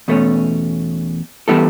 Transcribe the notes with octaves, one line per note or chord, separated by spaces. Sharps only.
E2 B2 A3 C#4
E3 G3 B3 E4 A4